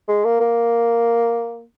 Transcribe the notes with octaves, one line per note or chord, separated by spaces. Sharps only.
G#3
A#3
A#3